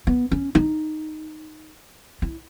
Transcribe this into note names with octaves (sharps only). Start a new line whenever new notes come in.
B3
C#4
D#4
E4